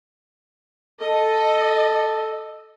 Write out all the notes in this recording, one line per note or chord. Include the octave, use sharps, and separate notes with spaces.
A4 D#5